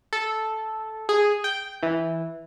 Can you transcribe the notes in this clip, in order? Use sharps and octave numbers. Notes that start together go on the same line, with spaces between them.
A4
G#4
G5
E3